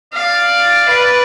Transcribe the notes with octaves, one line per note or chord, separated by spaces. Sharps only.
D5 F5
B4